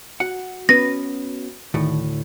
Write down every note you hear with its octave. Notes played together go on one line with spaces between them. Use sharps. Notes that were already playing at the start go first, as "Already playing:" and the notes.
F#4 F#5
B3 C#4 B4 A#6
D2 A2 D#3